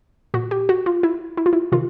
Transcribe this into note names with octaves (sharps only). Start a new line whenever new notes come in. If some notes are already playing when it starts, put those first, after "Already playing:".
A#2 F#4
G4
F#4
F4
E4
E4
F4
E4
C3 D#3 F4